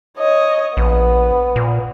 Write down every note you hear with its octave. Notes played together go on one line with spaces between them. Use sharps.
C#5 D#5
A#1 B3
A#2